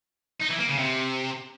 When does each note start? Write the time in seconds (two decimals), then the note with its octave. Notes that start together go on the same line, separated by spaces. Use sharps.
0.42 D#4
0.51 E3
0.60 A#3
0.69 C#3
0.78 C3